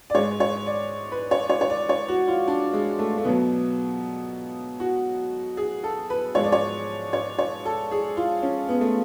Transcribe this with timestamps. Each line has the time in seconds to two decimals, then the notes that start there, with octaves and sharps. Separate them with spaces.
0.10 D5
0.15 G#2 G#3 C#5
0.40 C#5
0.66 D5
1.12 B4
1.31 C#5
1.50 C#5
1.61 C#5
1.70 D5
1.89 C#5
2.08 F#4
2.28 F4
2.48 D4
2.73 G#3
2.99 A3
3.18 A3
3.24 B2 F#3 B3
4.80 F#4
5.57 G#4
5.84 A4
6.10 B4
6.35 G#2 F3 G#3 C#5
6.44 D5
6.52 C#5
7.13 C#5
7.39 C#5
7.65 A4
7.91 G#4
8.17 F4
8.43 C#4
8.69 B3
8.81 A3